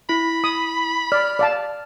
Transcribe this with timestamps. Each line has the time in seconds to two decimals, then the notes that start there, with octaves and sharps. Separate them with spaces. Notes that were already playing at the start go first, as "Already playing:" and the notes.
0.09 E4 B5
0.44 D#6
1.12 D5 F6
1.39 D5 F5 A5